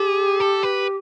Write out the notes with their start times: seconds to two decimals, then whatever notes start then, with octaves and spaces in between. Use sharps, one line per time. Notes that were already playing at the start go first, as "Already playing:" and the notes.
Already playing: G4 G#4
0.40 A4
0.63 B4